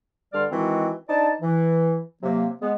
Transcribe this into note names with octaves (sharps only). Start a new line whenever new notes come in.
G2 D3 G3 D5 C6 F6
D#3 E3 G#3 C4 F#4
D4 D#4 C5 D5 A5
E3
C3 F#3 A#3
G#3 B3